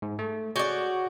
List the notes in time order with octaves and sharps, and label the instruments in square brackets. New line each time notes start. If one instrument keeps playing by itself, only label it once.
[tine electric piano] G#2
A3
[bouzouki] F#4 D5 [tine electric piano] G#4 C#5 G6